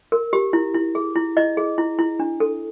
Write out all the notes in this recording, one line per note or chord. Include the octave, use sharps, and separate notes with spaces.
A#4
G4
E4
E4
G#4
E4
E4 D#5
G#4
E4
E4
D4
A4